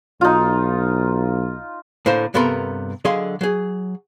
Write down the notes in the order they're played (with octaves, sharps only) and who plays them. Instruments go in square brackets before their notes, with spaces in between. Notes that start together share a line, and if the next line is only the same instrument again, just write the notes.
[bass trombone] B1 [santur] D#4 F4
[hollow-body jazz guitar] A2 D3 A#3 C5
G2 C3 B3 A4 A#4 C6
D3 F#3 G#4 D#5 F5 C6
F#3 G#4